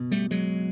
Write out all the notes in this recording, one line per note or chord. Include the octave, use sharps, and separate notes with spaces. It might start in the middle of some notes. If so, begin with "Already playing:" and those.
Already playing: F#1 B2
G3 A3
F#3 G#3